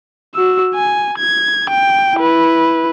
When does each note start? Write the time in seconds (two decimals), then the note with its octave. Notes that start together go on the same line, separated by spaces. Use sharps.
0.34 F#4 E6
0.75 G#5
1.18 G#6
1.70 G5
2.16 E4 B4